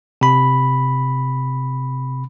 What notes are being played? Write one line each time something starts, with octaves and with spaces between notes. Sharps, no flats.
C3 B5